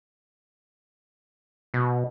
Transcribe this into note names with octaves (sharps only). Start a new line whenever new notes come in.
B2